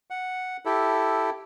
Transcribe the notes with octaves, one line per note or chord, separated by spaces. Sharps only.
F#5
E4 G4 A4